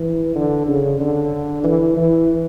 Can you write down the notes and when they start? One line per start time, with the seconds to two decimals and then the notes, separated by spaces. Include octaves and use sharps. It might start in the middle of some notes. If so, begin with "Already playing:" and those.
Already playing: E3
0.35 D3
0.67 C#3
1.00 D3
1.64 E3
1.97 E3